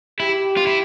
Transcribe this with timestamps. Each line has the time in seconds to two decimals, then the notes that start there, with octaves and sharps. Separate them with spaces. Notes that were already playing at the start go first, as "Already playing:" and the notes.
0.20 E4 G4
0.57 F4
0.67 E4